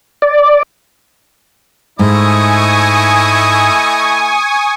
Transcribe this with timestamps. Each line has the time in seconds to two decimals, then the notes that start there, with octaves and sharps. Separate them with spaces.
0.22 D5
1.99 G#2 A3 E4 D#5 G#5 C#6 D#6